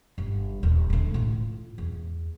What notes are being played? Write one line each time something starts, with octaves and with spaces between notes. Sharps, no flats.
G1
D#1
D#1 D3
A2 F4
E2